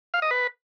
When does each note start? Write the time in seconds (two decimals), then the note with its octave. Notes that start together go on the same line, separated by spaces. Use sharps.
0.14 F5
0.22 D#5
0.31 B4